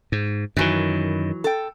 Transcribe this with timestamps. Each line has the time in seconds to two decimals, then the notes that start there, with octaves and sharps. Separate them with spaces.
0.12 G#2
0.57 F#2 D#3 E3 F#3
1.44 A4 G5